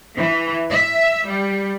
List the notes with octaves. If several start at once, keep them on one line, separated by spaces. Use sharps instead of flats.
E3
E5
G3